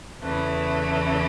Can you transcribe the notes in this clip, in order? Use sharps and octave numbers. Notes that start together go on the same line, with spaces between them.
E2 C#3 E3 A3 E4